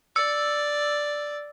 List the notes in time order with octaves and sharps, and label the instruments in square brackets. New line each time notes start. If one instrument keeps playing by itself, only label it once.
[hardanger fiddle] D5 [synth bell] E6